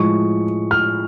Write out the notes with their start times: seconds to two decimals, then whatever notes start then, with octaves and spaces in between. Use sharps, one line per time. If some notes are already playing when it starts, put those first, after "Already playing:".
Already playing: A2 F3 G#3 C#6
0.71 F6